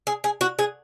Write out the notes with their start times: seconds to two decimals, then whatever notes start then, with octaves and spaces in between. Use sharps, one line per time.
0.07 G#4
0.24 G#4
0.41 F#4
0.59 G#4